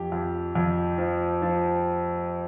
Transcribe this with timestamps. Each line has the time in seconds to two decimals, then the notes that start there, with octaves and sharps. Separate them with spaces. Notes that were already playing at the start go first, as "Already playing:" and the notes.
Already playing: F2 G4
0.12 F2
0.55 F2
0.98 F3
1.42 F3